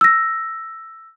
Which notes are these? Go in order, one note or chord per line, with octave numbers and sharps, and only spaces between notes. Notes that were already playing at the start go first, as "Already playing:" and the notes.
E6 A#6